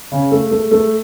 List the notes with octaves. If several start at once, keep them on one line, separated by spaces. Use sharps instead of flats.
C#3
A3
A3
A3